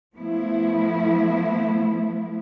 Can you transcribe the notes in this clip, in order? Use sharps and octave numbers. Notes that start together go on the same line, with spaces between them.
F3 A3 B3 E4